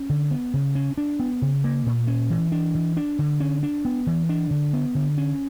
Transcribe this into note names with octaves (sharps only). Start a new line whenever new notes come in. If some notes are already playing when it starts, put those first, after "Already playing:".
Already playing: C#4
D3
B3
C#3
C#4
D4
B3
C#3
A#3
A#2
C#4
E3
D4
E3
D4
D3
C#4
D4
B3
E3
D4
D3
B3
D3
C#4